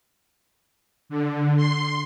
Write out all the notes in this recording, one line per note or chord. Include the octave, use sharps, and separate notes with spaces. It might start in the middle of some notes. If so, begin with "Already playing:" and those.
D3
C6